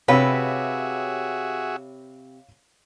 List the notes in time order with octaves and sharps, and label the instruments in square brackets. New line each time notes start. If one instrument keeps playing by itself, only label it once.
[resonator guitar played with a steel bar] C3 B4 [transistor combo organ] F#4 G#4 E5 [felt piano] C#5 F5 B5